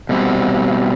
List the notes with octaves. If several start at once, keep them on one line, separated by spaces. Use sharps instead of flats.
B2 G3 C4